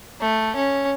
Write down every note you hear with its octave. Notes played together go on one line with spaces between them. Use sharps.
A3
C#4